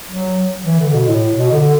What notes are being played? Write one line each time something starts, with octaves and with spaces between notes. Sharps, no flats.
F#3
E3
D3
B2
A2
B2
D3